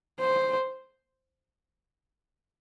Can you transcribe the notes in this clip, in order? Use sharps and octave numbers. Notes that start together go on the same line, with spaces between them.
C5